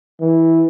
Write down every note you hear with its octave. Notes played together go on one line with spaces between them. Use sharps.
E3